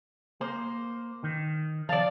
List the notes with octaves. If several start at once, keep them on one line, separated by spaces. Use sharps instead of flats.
A#3 C5
D#3
F3 D5 F5 A5